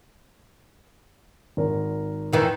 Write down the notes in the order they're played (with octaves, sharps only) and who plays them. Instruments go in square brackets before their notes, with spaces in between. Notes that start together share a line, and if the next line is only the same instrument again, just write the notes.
[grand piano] G#1 A#4
[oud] F2 D#3 E3